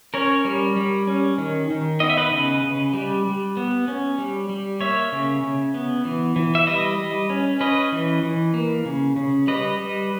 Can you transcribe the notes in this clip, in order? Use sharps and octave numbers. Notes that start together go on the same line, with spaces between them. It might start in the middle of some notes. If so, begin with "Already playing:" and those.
C#4 A#4 C#5
G3
G3
C#4
D#3
D#3
B3 D#5
E5
B4 D#5
C#3
C#3
G3
G3
B3
C#4
G3
G3
A#3 C#5 E5
C#3
C#3
B3
E3
E3
E5
G3 B4 D#5
G3
C#4
C#4 B4 D#5
E3
E3
A#3
C#3
C#3
G3 B4 D#5
G3